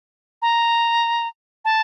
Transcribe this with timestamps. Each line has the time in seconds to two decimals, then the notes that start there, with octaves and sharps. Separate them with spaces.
0.42 A#5
1.65 A5